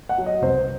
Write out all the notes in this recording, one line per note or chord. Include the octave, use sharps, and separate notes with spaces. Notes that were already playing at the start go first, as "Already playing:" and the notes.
F#5
F#3
D#5
C2 C5